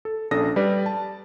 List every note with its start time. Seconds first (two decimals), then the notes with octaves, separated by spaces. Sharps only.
0.05 A4
0.31 A#1 C#4 D4 A4 D#6 A#6
0.56 G3 B4 D5
0.86 A5